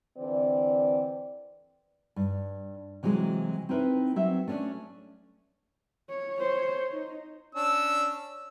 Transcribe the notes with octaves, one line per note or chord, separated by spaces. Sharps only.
D3 E3 C4 D5
G2
C3 E3 F#3 G#3
C4 D#4 E4 A#4 B4
F#3 C4 E5
A3 C#4 D4
C#5
C5 C#5
D#4
C#4 D4 E6